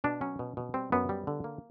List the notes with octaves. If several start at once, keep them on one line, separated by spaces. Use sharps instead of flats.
B2 D4
F#3 C#4
B2
B2
G3 C4
F#2 B3
G3
D3
A#3